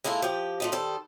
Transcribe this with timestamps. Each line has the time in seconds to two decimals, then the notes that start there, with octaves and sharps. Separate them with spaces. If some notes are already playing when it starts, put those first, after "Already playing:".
0.04 G#3 A#3 E4 F4 A4
0.22 F3 G4
0.60 F3 A3 D#4
0.72 D#3 G3 A4 C5